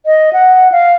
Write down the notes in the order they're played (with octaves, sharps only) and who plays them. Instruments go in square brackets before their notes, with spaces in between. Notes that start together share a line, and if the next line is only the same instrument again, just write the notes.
[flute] D#5
F#5
F5